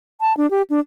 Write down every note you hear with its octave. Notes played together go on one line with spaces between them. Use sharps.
A5
D4
G4
D4